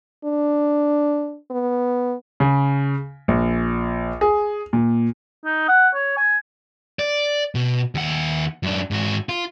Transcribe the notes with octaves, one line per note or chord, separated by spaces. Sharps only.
D4
B3
C#3
A#1
G#4
A#2
D#4
F#5
C#5
G#5
D5
B2
D#2 F#5
F#2 D4
G#2 F#4
F4